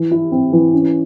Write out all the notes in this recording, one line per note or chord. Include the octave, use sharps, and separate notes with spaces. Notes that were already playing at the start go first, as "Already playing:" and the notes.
Already playing: E3
E4
C4
E3
C#4